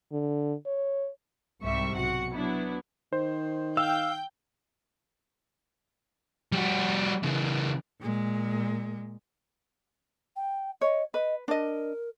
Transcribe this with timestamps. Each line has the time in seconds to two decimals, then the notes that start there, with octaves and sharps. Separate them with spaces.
0.12 D3
0.66 C#5
1.61 C2 G#2 C3 G3 E5 C#6
1.96 B1 F#4 F#5 C#7
2.34 F#3 B3 D4 E4
3.13 D#3 C5
3.77 F5 G5 E6 G6
6.52 G3 F#4
7.23 C#3 E3
8.01 A#2 G#3
10.36 G5
10.81 C#5 D#5
11.14 B4 D#5
11.48 D4 A#4 D#5